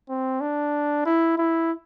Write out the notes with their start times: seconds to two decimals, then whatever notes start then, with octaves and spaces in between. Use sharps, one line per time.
0.09 C4
0.41 D4
1.06 E4
1.38 E4